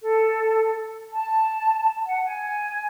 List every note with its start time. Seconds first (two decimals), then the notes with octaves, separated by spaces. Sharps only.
0.03 A4
1.14 A5
2.04 F#5
2.25 G#5